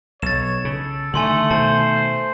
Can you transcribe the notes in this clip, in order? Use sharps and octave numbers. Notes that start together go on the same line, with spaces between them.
B1 C#5 A6 E7
C#3 A4
D3 D#3 A3 G#5 C6 F#7
B2 D#3 C5 A5